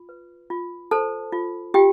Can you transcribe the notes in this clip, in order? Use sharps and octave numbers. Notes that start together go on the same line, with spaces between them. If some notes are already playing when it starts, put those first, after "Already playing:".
Already playing: F4
B4
F4
A4 C5 A5
F4
F4 G4 G5